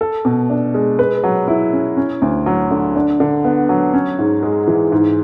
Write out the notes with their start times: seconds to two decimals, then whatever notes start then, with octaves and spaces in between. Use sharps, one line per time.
0.01 A4
0.25 B2
0.50 D4
0.74 G#3
0.99 B4
1.23 F#3
1.48 E4
1.73 C#4
1.97 C#4
2.22 D2
2.46 F#3
2.71 D3
2.96 D4
3.20 D3
3.44 B3
3.69 F#3
3.94 C#4
4.19 G#2
4.43 G#3
4.67 E3
4.92 G#2